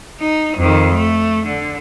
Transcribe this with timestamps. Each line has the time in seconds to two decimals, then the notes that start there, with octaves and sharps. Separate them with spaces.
0.20 D#4
0.58 F2 D#3
0.94 A3
1.47 D3